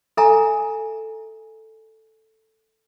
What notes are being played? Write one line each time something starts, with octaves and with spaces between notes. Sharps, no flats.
A4 E5 G#5 A#5